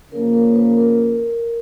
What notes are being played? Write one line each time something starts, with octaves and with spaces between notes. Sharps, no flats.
C#3 F3 A#3 C#4 A#4
A#4
B4
A#4